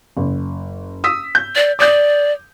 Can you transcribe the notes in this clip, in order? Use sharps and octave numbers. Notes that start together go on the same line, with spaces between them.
F#1
D#6 E6 B6
G6
D5
D5 D6 D#6 G6